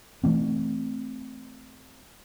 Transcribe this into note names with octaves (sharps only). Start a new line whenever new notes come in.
E3 A3 C4